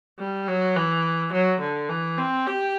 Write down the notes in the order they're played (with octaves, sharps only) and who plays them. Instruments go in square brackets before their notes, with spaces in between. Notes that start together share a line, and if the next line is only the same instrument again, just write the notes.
[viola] G3
F#3
E3
F#3
D3
E3
C4
G4